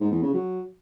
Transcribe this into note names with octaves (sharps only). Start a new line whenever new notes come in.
G#2
E2
C#3
F#3